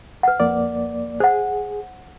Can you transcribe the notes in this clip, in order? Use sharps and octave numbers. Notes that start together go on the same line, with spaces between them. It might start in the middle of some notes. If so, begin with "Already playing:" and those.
B4 F#5
F2 A#3 D5
G#4 C5 F#5